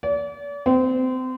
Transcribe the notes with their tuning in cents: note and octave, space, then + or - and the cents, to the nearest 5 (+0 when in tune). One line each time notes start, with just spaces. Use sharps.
D5 -40
C4 -30